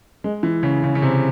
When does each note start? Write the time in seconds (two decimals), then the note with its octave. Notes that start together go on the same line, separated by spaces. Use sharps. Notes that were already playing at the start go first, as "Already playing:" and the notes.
0.24 G#3
0.43 E3
0.63 C#3
0.83 C#3
0.95 C#3
1.02 C3